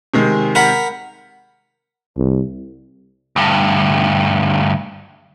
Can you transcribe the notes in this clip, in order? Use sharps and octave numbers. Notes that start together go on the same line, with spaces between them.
C3 D#3 G#3
A#4 F#5 B5
C2
D2 G2